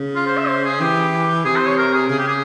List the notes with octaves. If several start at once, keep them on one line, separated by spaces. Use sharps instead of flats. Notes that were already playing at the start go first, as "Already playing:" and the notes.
Already playing: C#3
F4
C5
E5
C5
G#4
E3 G4
C3 G#4
C5
C#5
A#4
G#4
C#3 G#4
G4
G#4